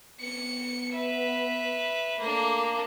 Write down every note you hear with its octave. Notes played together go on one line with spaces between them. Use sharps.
B3 C#7
B4 E5
A3 A#3 D4